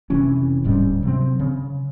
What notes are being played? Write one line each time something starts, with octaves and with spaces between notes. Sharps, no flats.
F1 C3 E3 C#4
D1 G#2 G3 C#4
C3 F#3 C4
C#3